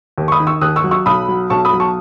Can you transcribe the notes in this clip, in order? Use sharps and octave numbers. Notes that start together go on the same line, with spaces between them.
D#2
C#6
B5 D#6
D#3
C#6 E6
D#2 D#6 F#6
C#6 E6
F#3
C#6 E6
B1 B5 D#6
F#3
B1 A5 C#6
B5 D#6
F#3
A5 C#6